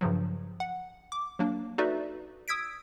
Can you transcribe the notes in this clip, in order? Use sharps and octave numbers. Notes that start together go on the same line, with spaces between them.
G2 C#3 F3 F#3
F#5
D6
F#3 A#3 D4
D#4 F#4 A4 B4 D5 E5
D#6 E6 G#6 B6 D7